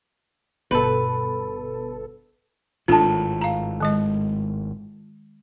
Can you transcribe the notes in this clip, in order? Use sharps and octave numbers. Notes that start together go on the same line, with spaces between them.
G1 B2 A4 B4
G#1 A2 D4 F4 A4 A5
F5 A#5
D#3 G#3 D#5